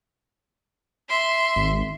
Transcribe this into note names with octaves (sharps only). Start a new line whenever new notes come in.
E5 C6
G#1